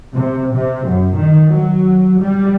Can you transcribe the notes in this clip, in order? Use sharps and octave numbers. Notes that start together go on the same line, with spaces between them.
C3
C3
F#2
D#3
F#3
G3